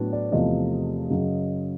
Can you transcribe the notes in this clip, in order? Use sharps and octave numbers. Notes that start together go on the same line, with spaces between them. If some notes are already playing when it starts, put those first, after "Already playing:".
Already playing: A2 F#3 B3 D4
D5
E2 C3 F3 A3 D#5
F#2 C#3 F#3